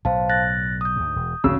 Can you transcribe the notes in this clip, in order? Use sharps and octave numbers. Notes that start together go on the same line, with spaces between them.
B1 A2 C5 F5 A5
F#6 A6 A#6
D#6 G6
D2 G#2
E1
A1 D2 G2 C#3 F#4 E6